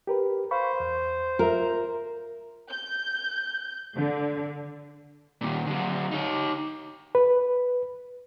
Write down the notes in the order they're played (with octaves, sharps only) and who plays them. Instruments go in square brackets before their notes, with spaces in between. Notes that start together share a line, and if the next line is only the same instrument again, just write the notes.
[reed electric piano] G4 A#4 B4
[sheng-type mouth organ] C5 [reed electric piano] F5 B5 C#6
[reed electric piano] E2
[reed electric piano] F4 E5 [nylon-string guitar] A#4
[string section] G6
D3
[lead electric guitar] A#2 D#3
D3 F#3
D#4 C#5
[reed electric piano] B4